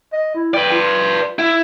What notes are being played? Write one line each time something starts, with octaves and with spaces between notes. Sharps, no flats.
D#5
E4
B4 D5 G5
F4
E4